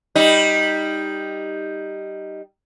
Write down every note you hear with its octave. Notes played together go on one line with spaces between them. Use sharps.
G3 D#4